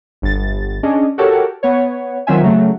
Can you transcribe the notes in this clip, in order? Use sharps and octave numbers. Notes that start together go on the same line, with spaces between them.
G1 A6
C#4 D4 G#4 D#5
F#4 G4 A4 A#4 C#5
B3 C#5
D#3 F#3 C4 F4 E5 G#5
C#3 F#3 A3